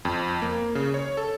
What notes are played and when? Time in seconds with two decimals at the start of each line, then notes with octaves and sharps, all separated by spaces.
0.05 F2
0.42 A#3
0.75 C#3
0.94 C#5
1.17 A4